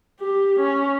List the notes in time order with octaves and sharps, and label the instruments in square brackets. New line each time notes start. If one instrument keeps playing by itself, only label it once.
[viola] G4
C#4